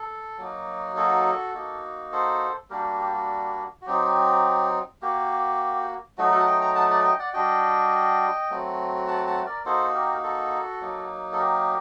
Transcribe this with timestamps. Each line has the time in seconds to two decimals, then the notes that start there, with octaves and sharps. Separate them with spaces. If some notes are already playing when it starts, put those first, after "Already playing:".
Already playing: A4
0.38 F#3 A#3 D#4 F#4
0.96 F#4 A4
1.55 A#3 D#4 F#4
2.12 A4 C5
2.70 G3 A#3 D4 F#4 G4 A#4
3.00 G4
3.14 F#4
3.82 F#4
3.86 F#3 C4 D#4 G4
5.02 A#3 F#4 G4
6.18 F#3 A3 D#4 F#4
6.32 F#4 A4
6.40 F#5
6.46 D#5 G5
6.61 G5 A#5
6.75 F#5 A5
6.90 D5 F#5
7.04 D#5 G5
7.19 D5 F#5
7.34 G3 D4 F#4 D#5 G5
8.50 F#3 A3 C4 F#4
9.08 F#5 A5
9.27 F#5 A5
9.46 A#4 D5
9.65 A#3 D#4 F#4 A4 C5
9.94 G4 A#4
10.23 F#4 A4
10.81 F#3 A#3 D#4
11.32 A4
11.39 G4 A#4